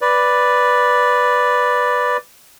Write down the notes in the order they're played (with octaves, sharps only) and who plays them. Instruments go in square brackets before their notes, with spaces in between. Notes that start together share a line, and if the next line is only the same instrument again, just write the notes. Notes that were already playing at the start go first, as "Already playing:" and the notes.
[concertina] B4 D5